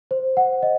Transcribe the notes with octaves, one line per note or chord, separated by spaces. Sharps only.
C5
F#5
D#5